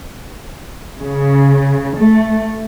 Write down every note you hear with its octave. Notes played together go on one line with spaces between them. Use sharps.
C#3
A3